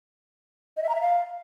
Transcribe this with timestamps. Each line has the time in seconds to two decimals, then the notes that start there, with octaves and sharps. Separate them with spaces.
0.77 D#5
0.83 E5
0.89 A#5
0.95 E5
1.01 F5